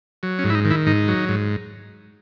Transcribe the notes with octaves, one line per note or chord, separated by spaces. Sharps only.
F#3
C#4
G#2
E4
D#4
D#3
E4
G#2 D#4
F#3
G#2